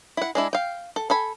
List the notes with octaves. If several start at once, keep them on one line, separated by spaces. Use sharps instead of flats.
E4 F#5
G#3 D4 E4
F5 G5
A4
A4 G#5 B5